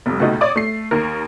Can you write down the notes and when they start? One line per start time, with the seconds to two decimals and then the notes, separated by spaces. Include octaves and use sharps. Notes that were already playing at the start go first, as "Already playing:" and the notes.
0.06 F1 F2 G3
0.20 C#2 B2 A3 D#4
0.41 C#5 D5 D6 D#6
0.56 A3 C7
0.91 D#2 A#4